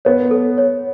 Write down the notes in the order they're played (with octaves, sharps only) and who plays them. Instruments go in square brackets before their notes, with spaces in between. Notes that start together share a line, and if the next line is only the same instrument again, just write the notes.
[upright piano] B3 [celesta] C#5
[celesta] A4
C#5